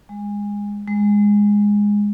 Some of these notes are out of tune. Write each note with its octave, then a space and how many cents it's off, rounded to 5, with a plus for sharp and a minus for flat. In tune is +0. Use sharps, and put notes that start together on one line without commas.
G#3 -20
G#3 -10